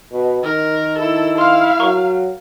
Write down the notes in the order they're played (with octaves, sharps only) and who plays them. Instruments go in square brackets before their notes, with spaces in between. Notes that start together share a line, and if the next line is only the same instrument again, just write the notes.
[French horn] B2
[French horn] D#3 [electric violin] A#4
[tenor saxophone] E4 [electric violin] A4
[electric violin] F5 [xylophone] C6 F6
[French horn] F#3 [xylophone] A#4 A#5 C#6